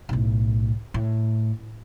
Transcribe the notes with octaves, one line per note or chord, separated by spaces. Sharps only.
B1 A2
A2